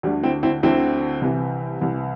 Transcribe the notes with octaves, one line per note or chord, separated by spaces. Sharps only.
D2 D3 G3
C4 E4
C4 E4
D2 D3 C4 E4
C2 C3 E3
C2 C3 E3